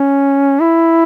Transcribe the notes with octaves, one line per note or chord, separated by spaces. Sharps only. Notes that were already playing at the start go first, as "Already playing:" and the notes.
Already playing: C#4
E4